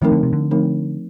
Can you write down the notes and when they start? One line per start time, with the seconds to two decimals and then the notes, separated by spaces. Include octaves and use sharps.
0.02 D#3 F3 A3 C4 D#4 A#4
0.12 D3
0.23 C3
0.33 D3
0.51 F3 A3 C4 D#4 A#4